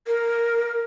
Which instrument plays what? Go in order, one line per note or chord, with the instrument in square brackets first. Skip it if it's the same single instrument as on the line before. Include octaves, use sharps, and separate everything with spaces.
[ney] A#4